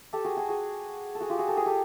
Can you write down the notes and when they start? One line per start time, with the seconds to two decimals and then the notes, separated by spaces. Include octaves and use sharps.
0.13 G4 A4
0.25 F#4 G#4
0.37 F#4 G#4
0.49 F#4 G#4
1.15 A4
1.20 F#4 G#4
1.30 F4 G4
1.38 F#4 G#4
1.48 G4 A4
1.57 G#4 A#4
1.66 G4 A4